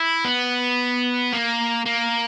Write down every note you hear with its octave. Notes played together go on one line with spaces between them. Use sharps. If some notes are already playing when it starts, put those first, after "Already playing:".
Already playing: E4
B3
A#3
A#3